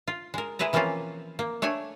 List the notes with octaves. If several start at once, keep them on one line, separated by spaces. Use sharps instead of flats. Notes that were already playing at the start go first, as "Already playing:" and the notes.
F4
G#3 A#4
G#3 E4 G#4 B4 A#5
E3 F3 A#3 C4 C#4 F4
A#3
A3 D4 C#5 G#5